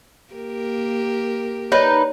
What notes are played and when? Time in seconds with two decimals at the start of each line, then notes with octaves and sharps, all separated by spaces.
0.34 A#3 G4 A#4
1.72 D#4 B4 C#5 D5